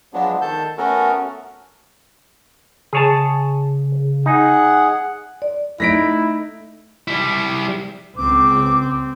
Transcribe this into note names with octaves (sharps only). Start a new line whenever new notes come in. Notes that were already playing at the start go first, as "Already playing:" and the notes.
F3 F#3 G#3 B3 D4
D#3 A4 A5 G6
A3 B3 C#4 F#4 A4 A#4
C#3 G#4 C#5 A5
D#4 G#4 F#5
D5
A3 D#4 E4 A#6 B6 D7
G3 E4
C#2 C#3 C4 D6